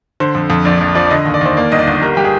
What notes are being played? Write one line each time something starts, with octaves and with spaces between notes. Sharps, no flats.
D3 C5
F2
F2
A#1 D5
A#1
F3 D5
D5
D3 D#5
D#2
D5
D#2 C5
A#3 D5
G1 D#5
D5
G1
G3 A#4
G3 G4
G#4